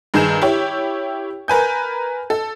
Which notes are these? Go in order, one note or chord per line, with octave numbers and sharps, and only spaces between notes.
G2 D#3 G#4 A#5 G6 E7
E4 G4 C#5
A#4 B4 G#5 G6
A4